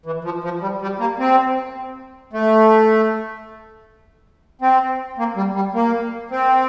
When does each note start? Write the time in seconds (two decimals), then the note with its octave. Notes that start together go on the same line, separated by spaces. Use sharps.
0.06 E3
0.24 F3
0.44 F3
0.62 G3
0.82 G3
1.00 A#3
1.19 C4
2.33 A3
4.61 C4
5.18 A#3
5.36 G3
5.55 G3
5.74 A#3
6.31 C4